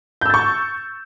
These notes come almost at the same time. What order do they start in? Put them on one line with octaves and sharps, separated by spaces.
G6 E6 A6 C#6